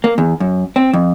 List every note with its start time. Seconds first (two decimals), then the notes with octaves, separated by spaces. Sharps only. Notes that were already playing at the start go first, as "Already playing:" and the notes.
0.04 A#3
0.18 E2
0.40 F#2
0.76 C4
0.93 F2